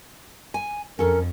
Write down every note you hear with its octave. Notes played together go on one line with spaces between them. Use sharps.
G#5
F2 C#4 A4 A#4